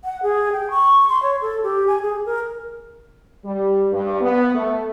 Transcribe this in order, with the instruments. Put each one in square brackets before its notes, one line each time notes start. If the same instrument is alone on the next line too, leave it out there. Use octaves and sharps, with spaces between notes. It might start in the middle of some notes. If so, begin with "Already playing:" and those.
[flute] F#5
G#4
G5
C#6
C6
C#5
A4
G4
G#5
G#4
A#4
[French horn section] G3
G2
B3
A3